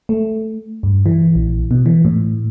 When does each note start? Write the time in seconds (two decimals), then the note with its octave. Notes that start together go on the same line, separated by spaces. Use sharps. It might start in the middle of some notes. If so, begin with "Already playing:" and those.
0.09 A3
0.83 G2
1.06 E3
1.35 A#1
1.71 B2
1.86 E3
2.05 A2